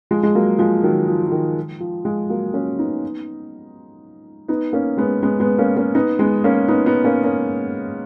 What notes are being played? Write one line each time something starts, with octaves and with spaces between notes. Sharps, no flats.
F3 G#3
G#3
F#3 A#3
F3 G#3
D#3 F#3
F3
F3
D#3
F3
F3 G#3
F#3 A#3
A#3 C#4
B3 D#4
B3 D#4
A#3 C#4
G#3 B3
G#3 B3
G#3 B3
A#3 C#4
A#3 C#4
B3 D#4
G#3 B3
A#3 C#4
B3 D#4
B3 D#4
A#3 C#4
A#3 C#4